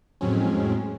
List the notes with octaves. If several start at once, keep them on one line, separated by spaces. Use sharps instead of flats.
F2 A2 F#3 G#3 C4 C#4